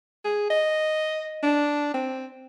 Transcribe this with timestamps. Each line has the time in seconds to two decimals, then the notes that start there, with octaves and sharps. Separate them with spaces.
0.25 G#4
0.50 D#5
1.43 D4
1.94 C4